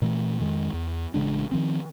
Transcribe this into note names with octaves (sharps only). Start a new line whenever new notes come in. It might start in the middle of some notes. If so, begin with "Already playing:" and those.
A#2 E3 A3
F2 D#3 G#3
E2
A1 C#3 G#3 D4
D#3 F3 C4